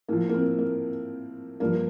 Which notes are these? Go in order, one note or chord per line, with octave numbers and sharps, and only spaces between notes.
A2 F3 A#3
A#3
C4
A#3
G2 F3 A#3